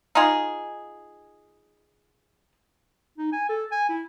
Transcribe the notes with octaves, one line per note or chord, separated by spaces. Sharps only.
D#4 F4 G#4
D#4
G#5
A4
G#5
E4